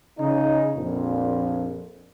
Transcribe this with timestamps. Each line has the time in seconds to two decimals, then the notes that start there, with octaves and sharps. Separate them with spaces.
0.20 C#3 D#4
0.77 A#1 F2 A#2